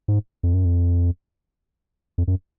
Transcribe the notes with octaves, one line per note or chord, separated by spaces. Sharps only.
G#2
F2
F#2
F2
F2
F#2